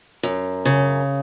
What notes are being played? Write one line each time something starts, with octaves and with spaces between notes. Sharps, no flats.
F#2
C#3